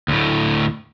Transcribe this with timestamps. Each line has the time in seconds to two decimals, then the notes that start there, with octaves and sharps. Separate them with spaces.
0.08 D2 A2